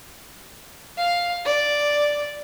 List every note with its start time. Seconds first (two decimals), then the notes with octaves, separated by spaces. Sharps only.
0.98 F5
1.45 D5